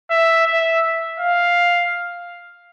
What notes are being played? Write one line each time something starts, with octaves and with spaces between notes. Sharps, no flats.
E5
E5
F5